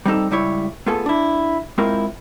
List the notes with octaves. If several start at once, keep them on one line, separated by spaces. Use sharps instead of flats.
G3 C4 D#4 A4
C#2 G3 E4 C#5
A3 B3 F4 G#4 A4
D4 E4
G#3 C4 E4 F4 A#4 C5